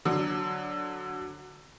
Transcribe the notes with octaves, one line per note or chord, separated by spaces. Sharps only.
D3 F#3